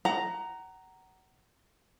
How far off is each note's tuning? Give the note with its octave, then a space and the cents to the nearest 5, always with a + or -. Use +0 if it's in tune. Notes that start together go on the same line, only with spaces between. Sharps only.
F#5 +30 A#5 +0